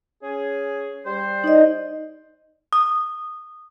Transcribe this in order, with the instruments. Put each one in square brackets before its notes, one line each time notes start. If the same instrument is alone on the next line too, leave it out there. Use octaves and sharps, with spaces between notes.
[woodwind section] C#4 G#4
G3 C5
[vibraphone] D#4 D5 D#5
[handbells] D#6